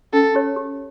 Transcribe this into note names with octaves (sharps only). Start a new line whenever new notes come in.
C#4 A4
G4 C#5
G4